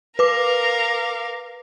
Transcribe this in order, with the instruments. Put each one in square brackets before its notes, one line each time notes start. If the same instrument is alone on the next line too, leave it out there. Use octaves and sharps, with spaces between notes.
[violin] A#4 F5 [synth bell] B4 D6